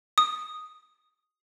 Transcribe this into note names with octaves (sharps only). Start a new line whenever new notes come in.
D#6